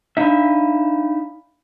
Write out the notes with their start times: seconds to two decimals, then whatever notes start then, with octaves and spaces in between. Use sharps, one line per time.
0.17 D4 D#4 E5 F5 B5